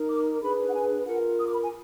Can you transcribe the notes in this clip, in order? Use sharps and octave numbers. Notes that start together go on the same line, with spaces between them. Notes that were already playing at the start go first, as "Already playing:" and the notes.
Already playing: D#4 A#4
D6
D4 G#4 B4 B5
F#5
G#5
F4 A#4 F#5
D#6
D6
B5
G#5